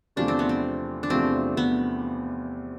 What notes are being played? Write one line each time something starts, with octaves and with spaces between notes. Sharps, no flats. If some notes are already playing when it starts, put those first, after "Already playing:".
E2 C3 F3 A3 D4
C4
B3
C4
D4
E2 C3 F3 A3 C4
B3